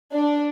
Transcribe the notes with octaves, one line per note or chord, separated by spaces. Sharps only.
D4